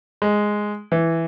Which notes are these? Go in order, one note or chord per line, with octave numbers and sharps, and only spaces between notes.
G#3
E3